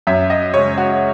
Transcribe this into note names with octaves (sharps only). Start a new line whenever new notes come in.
F#2 E5
D#5
C#3 G#3 C#5
F#4